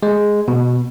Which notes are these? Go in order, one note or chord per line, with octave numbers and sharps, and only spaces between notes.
G#3
B2